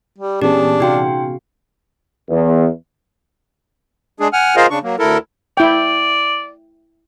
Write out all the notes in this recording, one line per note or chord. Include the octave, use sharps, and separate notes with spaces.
G3
A#2 E3 B3 C#4 D4 G4 G#4 A5
C3 D#4 F#4 F5 G5 C6
E2
G#3 D4 G#4
F#5 G#5 F6
F4 G#4 A#4 C5 D#5 F5
C#3 D4 C#6
F#3 A#3
D2 E4 A4 A#4
E4 D5 G5